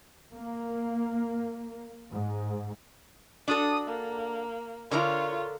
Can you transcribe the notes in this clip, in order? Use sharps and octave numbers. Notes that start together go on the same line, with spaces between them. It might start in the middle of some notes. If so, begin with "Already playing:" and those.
A#3
G#2
D4 F#4 A4 D#6
A#3
D3 F4 A#4 C#5 A#5